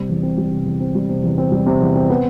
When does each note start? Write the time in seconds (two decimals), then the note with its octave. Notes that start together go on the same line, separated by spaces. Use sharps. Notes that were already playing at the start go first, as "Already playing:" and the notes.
Already playing: C3 G3
0.09 E2
0.23 C4
0.37 G3
0.51 C3
0.66 E2
0.80 C4
0.95 G3
1.09 C3
1.24 E2
1.38 C4
1.52 G3
1.66 C3
1.81 E2
1.96 C4
2.10 B3